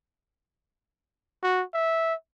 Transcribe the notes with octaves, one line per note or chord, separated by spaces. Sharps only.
F#4
E5